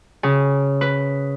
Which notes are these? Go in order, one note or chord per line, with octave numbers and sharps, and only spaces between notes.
C#3
B4